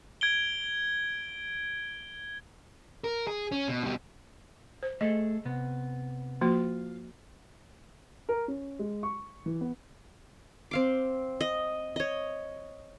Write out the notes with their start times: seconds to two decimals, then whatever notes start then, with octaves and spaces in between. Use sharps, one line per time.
0.21 G#6 D7 G7
3.04 A#4
3.27 G#4
3.52 C#4
3.68 B2
3.84 B2 G3
4.83 C5
5.01 A3 G#4 A4 D#5
5.45 C3 B3
6.41 F3 A#3 F4 F#4
8.29 A#4
8.48 C#4
8.79 G#3
9.03 C#6
9.46 E3
9.61 B3
10.71 C4 F5 D6
11.41 D#5
11.96 C#5 D#5